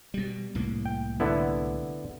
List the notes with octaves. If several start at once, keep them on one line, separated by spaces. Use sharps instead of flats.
B2 G3
C2 A2 A#3
G5
D3 B3 E4